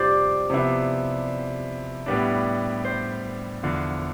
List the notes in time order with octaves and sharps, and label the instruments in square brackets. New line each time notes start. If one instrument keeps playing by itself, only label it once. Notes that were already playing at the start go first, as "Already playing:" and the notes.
Already playing: [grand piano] F2 C3 G3 D4 [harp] F4 G4 C5 D5
[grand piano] C3 F3 B3 E4
A2 G3 B3 D4
[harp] C5
[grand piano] E2 D3 F3